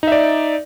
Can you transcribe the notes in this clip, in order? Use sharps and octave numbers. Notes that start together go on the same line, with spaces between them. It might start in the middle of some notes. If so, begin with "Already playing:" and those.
D#4 D5 E5